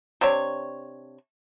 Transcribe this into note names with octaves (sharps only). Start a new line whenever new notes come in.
C3 D4 C#5